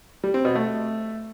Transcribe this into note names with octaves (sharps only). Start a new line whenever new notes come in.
G3
C4
B2
A3